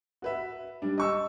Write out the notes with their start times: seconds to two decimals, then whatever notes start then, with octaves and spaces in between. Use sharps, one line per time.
0.22 F#4 B4 E5
0.82 G3 D4
0.98 D#5 C#6 E6